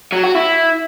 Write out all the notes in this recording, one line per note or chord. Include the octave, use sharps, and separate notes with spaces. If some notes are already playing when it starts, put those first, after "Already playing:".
F#3
F#4
E4